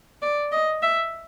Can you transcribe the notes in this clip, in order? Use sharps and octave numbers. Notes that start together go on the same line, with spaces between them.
D5
D#5
E5